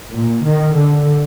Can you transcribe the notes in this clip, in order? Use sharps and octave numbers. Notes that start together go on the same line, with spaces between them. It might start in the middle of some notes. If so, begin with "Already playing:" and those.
A#2
D#3
D3